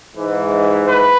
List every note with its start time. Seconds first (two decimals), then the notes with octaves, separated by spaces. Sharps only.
0.16 G#2 E3
0.88 B4